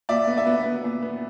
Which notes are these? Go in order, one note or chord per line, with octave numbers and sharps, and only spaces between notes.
A#2 D5 E5
B3
D5 E5
B3
B3
A#2
B3